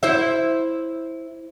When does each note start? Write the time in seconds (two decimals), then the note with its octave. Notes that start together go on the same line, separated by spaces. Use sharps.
0.03 E4 C5 E5